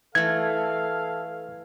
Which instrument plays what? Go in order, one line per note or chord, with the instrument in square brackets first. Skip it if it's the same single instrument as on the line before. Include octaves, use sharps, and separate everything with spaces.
[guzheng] E3 A3 [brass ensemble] A4 F5 [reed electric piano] G#6